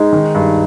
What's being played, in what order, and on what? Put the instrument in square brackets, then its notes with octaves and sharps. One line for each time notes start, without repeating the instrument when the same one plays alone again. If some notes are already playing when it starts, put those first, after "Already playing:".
Already playing: [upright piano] G#3 [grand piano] D#4
[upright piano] D#3
G2